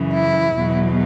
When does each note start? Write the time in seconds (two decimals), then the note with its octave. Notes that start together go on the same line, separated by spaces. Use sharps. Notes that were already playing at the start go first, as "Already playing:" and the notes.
Already playing: F#2 C#3 E3
0.13 E4
0.54 E2 B2 F#3